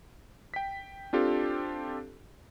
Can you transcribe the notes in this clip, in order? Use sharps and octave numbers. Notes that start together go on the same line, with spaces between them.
G5 B6
C4 D4 F4 G4 A4